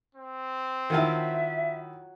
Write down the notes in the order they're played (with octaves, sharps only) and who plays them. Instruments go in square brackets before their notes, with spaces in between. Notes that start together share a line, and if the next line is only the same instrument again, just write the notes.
[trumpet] C4
[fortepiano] D#3 E4 [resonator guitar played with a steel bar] F#3 F4 A5 [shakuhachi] E5